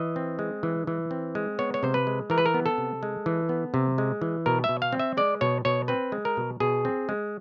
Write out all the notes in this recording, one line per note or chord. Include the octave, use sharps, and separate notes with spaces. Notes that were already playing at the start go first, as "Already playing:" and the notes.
Already playing: E3 D#5
C4
G#3
E3
E3
C4
G#3
B3 C#5
C#5
C3 C5
B4
G#3
E3 A#4
B4
A#4
B3
A4
C3
G#3
E3
B3
C3
G#3
E3
B2 A#4
B2 E5
F5
C4
E5
G#3 D5
B2 C#5
B2 C#5
C4 B4
G#3
A#4
B2
B2 G#4
C4
G#3